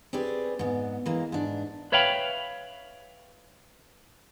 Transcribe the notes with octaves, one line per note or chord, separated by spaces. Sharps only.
C4 G4 G#4 B4 D5
G#2 B3
E3 G#3 A#3
G#2 D4
B4 C#5 E5 F5 G5 B5